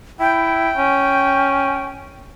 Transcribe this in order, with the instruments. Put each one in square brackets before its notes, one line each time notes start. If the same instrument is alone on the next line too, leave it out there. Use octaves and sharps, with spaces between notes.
[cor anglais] E4 [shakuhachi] G5
[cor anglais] C#4